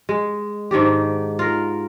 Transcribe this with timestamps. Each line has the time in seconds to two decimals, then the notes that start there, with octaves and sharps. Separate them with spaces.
0.09 G#3
0.71 G#2 D#3 D4 G4
1.39 F4 A#4